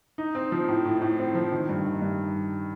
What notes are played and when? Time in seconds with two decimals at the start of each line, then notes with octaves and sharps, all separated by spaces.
0.18 D#4
0.35 C4
0.52 F3
0.68 A2
0.85 A2
1.01 A2
1.18 C4
1.35 F3
1.52 D#3
1.69 G2
1.85 D#3
2.02 G2